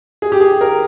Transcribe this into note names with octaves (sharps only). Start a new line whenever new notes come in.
G#4
G4
G#4
A#4